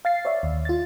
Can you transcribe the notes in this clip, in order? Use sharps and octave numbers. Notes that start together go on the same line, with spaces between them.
F5 A6 C7
C#5 D5 E5
D#2
F4 A6